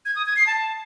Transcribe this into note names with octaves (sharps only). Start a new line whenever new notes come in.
G#6
D#6
G#6
C7
A5